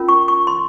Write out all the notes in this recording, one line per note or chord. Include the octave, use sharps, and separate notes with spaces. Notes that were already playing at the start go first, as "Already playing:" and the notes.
Already playing: C#4 F4 A#4
C#6
C#6
C6